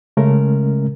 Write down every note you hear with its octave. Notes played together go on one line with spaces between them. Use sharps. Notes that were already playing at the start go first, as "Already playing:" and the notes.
C#3 G#3 A3 C#4 A#4